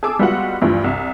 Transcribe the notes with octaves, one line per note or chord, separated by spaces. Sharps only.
G#4 A4 G#5 A5 D6 E6
G3 G#3 B3 F4 F#4 F#5
D2 G2 E3 F3
C2